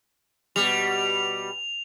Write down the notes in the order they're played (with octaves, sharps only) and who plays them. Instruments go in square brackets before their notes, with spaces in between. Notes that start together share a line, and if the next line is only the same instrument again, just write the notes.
[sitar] B2 G3 [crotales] F7